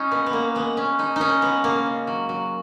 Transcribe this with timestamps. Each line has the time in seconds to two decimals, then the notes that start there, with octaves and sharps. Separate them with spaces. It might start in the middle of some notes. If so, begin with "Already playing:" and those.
Already playing: G#3 C#4 D#4
0.11 A#2 B3
0.26 B3
0.33 A#2 A#3
0.55 G#3 B3
0.77 A#2 C#4
0.99 G#3 D#4
1.16 A#2 C#4 D#4
1.42 G#3 B3
1.64 C#3 A#3
1.86 C#3
2.07 F#3
2.29 F#3